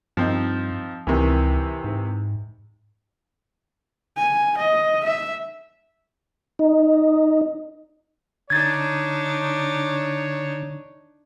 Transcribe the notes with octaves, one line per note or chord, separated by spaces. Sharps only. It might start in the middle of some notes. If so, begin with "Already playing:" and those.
G2 F3 C4 D#4
C#2 C3 D#3 E3
G#2
G#5
D#5
E5
D#4
D3 D4 D#4 C#5 G#6 A6